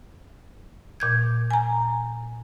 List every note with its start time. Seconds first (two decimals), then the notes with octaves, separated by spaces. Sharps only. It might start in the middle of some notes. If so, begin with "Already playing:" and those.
1.00 A#2 G6 G#6
1.51 G#5 A#5